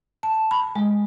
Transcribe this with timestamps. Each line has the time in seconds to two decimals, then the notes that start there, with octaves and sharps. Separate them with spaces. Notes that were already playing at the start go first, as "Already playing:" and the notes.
0.23 A5
0.51 B5
0.76 G#3